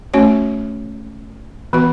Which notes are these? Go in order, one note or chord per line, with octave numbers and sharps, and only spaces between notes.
A3 C#4 F#4 C#5
E3 B3 F#4 B4